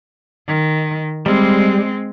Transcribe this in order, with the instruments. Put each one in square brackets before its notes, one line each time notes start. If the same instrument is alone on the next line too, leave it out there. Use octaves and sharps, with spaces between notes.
[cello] D#3
[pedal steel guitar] G3 [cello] G#3 C4